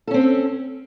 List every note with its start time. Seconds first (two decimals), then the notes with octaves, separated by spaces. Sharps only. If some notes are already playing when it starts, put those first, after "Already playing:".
0.07 A4
0.11 C#4
0.14 C4